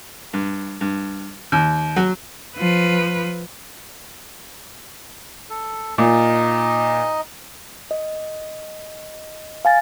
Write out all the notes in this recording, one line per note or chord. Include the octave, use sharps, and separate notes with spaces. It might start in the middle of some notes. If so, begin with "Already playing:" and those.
G2
G2
D#2
F#3
F3 B4
A4
A#2 D#4 D#5
D#5
F5 G#5 A6